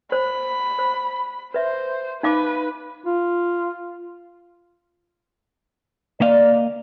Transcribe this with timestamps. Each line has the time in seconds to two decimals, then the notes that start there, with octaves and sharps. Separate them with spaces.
0.12 C5 B5
0.79 C5
1.54 B4 C5 E5
2.23 D#4 B4 F5 D6
3.05 F4
6.21 A#3 D5 D#5 F5